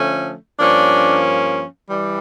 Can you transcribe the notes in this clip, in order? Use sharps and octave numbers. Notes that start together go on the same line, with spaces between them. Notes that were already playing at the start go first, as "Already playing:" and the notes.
Already playing: D3 F3 A3 C#4
G2 F3 A#3 C#4 D4
E3 G3